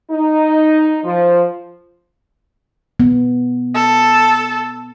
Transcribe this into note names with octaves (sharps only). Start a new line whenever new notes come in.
D#4
F3
B3
A4